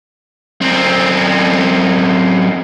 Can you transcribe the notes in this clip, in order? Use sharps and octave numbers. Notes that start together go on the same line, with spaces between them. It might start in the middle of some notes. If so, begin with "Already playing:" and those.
F#2 C4